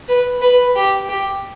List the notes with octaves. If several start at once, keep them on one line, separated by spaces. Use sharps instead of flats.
B4
B4
G4
G4